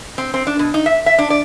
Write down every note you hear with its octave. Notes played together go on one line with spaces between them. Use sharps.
C4
C4
D4
B2
D#4
E5
E5
D4
D5